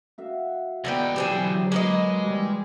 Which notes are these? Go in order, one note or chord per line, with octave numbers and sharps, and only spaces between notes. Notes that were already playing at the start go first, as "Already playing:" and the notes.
F#4 E5 F5
E2 D3 B3 D#4 B4 G5
D3 F#3 G3 C4 G#4
G#3 A#3 B4 D#5
E3 G3